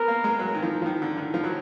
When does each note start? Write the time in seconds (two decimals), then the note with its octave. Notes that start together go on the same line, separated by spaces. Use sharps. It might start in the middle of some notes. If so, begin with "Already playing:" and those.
Already playing: B3 A#4
0.08 A#3
0.24 G#3
0.39 F#3
0.55 D#3
0.62 F3
0.82 F3
0.86 D#3
1.02 D3
1.17 D#3
1.34 F3
1.44 F#3